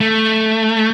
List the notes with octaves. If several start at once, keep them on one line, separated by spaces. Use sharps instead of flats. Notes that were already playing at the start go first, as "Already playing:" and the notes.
A3